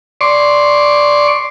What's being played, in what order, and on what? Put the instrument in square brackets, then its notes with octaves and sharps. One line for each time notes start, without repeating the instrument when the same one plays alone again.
[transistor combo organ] D5 C6 C#6